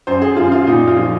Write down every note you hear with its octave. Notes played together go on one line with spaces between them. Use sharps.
F#2 C5
G#4
F#2 F4
F4
A#2 D#4
F4
F3